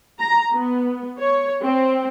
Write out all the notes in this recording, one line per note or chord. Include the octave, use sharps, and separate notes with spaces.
A#5
B3
C#5
C4